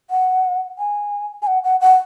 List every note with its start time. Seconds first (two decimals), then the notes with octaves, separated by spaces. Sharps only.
0.10 F#5
0.78 G#5
1.42 G#5
1.47 F#5
1.64 F#5
1.81 F#5